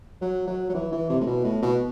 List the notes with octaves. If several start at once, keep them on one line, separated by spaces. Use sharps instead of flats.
F#3
F#3
F#3
E3
E3
C3
A2
B2
A2
B2